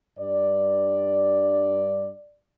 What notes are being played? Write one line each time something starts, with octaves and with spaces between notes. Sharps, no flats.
G2 D5